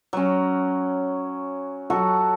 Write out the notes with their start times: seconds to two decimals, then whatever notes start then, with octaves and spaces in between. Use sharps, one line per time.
0.13 F#3 C#4
1.90 F#3 F#4 A4 F#5